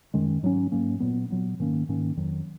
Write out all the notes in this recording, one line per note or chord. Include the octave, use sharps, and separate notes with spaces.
F#2 D#3 G#3 C#4
G#2 F#3 A#3 C#4
G#2 F#3 A#3 C#4
A#2 F#3 B3
A#2 F#3 B3
G#2 D#3 A#3 C#4
G#2 D#3 A#3 C#4
F2 D#3 F#3